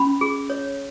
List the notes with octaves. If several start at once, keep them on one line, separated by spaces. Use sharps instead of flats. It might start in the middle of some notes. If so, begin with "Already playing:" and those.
Already playing: C#4 B5
G#4
C#5